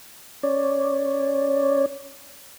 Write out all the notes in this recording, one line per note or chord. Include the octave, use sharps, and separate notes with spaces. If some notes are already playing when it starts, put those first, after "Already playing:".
C#4 C#5 D5